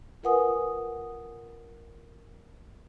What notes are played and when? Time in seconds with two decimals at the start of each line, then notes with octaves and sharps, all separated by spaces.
0.23 F4 A#4 B4 F#5 G#5 D#6